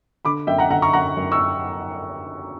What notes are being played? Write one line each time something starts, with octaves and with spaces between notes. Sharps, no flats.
D3 B5 D6
F#2 E5 G5
F#5 A#5
D3 F#5 A#5
A#5 C#6
F#2 F#5 A#5
F#2
C#6 E6